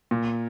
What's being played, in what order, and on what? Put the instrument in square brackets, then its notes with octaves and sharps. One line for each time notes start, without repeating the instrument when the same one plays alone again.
[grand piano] A#2